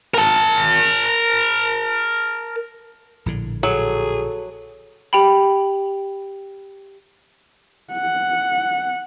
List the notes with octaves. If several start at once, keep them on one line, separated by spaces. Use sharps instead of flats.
A#4 A5
A#1 A2 D3
F#3 G#4 A4
G4 G5 B5
F#5